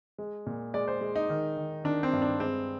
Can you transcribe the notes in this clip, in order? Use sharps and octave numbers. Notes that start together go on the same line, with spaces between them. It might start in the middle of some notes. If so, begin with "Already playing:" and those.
G#3
A#2
G#3 D5
C5
G#3
D#4
D#3
D#3
D#3 D4
C4
G2
D4
G#3 C4